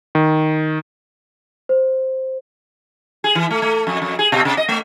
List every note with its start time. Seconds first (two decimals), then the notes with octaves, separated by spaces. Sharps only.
0.15 D#3
1.69 C5
3.24 G#4
3.35 E3
3.51 A3
3.62 A3
3.87 F2
4.02 F2
4.19 G#4
4.32 B2
4.45 C3
4.57 D#5
4.68 A3